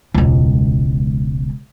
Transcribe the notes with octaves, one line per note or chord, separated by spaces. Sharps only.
E1 C#2